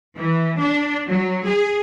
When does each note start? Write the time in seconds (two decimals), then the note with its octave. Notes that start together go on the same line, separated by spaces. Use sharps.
0.15 E3
0.60 D4
1.08 F#3
1.46 G#4